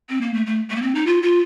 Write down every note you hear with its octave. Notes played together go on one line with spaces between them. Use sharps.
C4
A#3
A3
A3
A3
A#3
C4
D#4
F4
F4